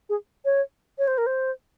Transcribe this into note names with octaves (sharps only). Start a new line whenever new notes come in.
G#4
C#5
C#5
C5
A#4
C5